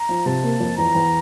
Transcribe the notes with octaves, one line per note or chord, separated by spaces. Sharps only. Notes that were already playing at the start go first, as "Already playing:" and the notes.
Already playing: A#5
F3
C3 A5
A#3
F2
E2 A#5
E2